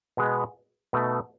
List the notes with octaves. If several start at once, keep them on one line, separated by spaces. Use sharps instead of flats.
B2 G#3 B3
B2 A3 D#4